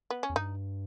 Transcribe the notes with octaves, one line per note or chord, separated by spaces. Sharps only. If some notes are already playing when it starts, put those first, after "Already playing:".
B3
C#4
E2
G2 D#4